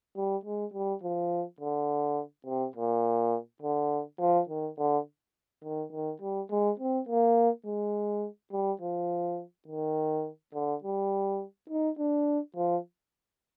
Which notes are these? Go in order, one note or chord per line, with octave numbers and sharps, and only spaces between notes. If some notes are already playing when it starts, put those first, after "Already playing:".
G3
G#3
G3
F3
D3
C3
A#2
D3
F3
D#3
D3
D#3
D#3
G3
G#3
C4
A#3
G#3
G3
F3
D#3
D3
G3
D#4
D4
F3